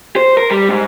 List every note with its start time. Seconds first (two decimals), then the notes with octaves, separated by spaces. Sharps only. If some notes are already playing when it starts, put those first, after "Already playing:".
0.16 C5
0.37 A#4
0.51 G3
0.69 G#2